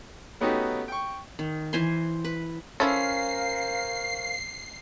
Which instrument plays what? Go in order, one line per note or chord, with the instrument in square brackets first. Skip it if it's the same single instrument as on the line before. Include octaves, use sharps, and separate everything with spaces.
[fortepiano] A3 B3 C#4 D#4 F#4 G4
G5 C#6
[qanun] D#3
E3 C5 G#5 C6
B4
[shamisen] F3 E4 A4 [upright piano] C#4 [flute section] A#4 C5 F5 [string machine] C7